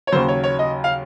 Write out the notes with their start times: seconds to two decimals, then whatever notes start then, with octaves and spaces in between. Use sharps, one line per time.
0.07 C#5
0.12 D#2 C#3 F#3 C5
0.28 C#5
0.44 C#5
0.59 D#5
0.84 F5